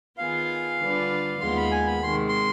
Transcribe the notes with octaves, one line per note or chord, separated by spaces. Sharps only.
D#3 B3 F4 G#4 F5
D3 G3 D4 F4 B4
D#2 D#3 G#3 B3 F4 C6
B5
G#5
B5
C3 D#3 G#3 C6
C6